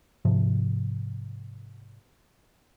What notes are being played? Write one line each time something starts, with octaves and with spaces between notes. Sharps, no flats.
G#2 C3 F3